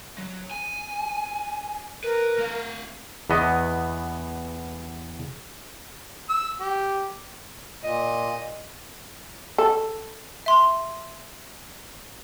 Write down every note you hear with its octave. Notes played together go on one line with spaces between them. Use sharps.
F#3
G#5
A#4 B4
A3 F5
E2 B3 D#5
E6
G4
A#2 D#5
A4
E5 C6